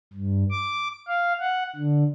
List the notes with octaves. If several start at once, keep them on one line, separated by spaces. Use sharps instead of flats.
G2
D6
F5
F#5
D3